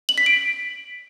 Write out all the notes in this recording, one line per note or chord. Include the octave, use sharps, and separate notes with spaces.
F#7
B6
D7